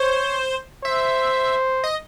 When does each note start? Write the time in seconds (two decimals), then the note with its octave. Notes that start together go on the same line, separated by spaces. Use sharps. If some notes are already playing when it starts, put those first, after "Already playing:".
Already playing: C5 C#5
0.84 C5 E5
1.84 D#5